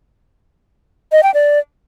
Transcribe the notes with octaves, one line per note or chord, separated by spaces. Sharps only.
D#5
G5
D5